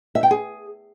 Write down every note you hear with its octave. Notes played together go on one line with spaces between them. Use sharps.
E5
G5
G#4